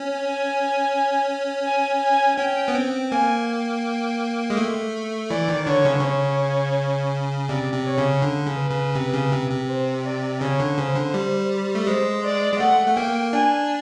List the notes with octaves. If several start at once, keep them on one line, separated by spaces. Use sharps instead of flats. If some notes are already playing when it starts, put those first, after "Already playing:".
Already playing: C#4
G#5
G#5
G#5
C#4 G5
B3
C4
A#3 G#5
G5
G#3
A3
E3 D5
D#3
D3 C#5
C#3
D3
C#3 C#5
C3 D5
C3
C#5
C#3
D3
C#3
B4
C#3
C3
C#3
C3
C3
C5
D5
C#3 C#5
D3
C#3 C5
D3
G3
A3
G#3 C5
D5
G#3
A3 F#5
A3
A#3 G5
D4 G#5